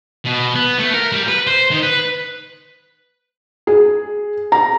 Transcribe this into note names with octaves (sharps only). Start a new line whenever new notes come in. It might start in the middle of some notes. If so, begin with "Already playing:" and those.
B2
B3
A3
A#4
G3
B4
C5
D#3
B4
G#4
A#5